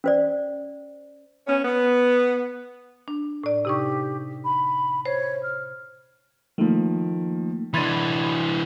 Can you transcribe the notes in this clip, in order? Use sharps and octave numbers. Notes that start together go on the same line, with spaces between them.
C#4 C5 D5
B3 C#4
B3
D4
A2 D5
C3 D#4 G4 C#6
B5
C5 C#5
F6
D#3 F3 A3 A#3
E3 D4 B5 C6 G#6 A6 D#7